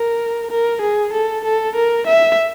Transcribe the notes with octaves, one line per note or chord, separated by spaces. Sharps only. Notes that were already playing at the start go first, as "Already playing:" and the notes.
Already playing: A#4
A#4
G#4
A4
A4
A#4
E5